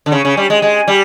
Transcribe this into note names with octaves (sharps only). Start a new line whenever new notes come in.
D3
C#3
C#3
G3
G#3
G#3
G3